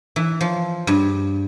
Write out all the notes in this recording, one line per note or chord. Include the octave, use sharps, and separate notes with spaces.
E3
F3
G2